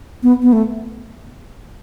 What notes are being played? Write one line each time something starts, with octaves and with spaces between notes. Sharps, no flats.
B3
B3
A3